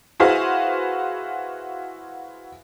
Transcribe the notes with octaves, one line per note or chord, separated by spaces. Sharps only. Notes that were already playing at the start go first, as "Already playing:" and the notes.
E4 F#4 G#4 B4 C5 F5